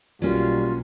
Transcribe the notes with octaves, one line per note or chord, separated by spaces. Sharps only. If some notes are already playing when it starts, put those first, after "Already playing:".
B1 F#3 G3 A#3 C#4 F4